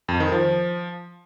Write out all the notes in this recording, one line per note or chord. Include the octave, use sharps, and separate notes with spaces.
F2
D#3
F3